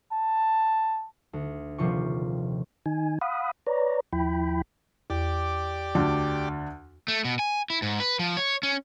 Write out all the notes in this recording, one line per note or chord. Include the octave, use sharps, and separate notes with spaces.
A5
D2
D#1 C3 F3 F4 C#6
D#3 D#4 G#5
F5 F#5 B5 D#6
B4 C#5 D5 A#5
D#2 F3 E4 G5 B5
E2 G4 D5
D2 D4
A3
B2
G#5
E4
G#2
B4
F3
C#5
C#4